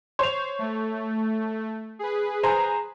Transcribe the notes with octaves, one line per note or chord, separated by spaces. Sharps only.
C5 C#5 F7
A3
G#4 B4
C5 G#5 A#5